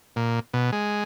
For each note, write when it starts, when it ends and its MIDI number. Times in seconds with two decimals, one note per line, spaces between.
0.16 0.40 46
0.53 0.71 47
0.72 1.04 56